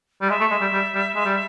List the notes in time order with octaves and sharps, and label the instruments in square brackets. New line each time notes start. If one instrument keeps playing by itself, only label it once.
[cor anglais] G3
[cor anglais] G#3 [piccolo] E5
[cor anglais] A3
G#3
G3
G3
G3
G#3
G3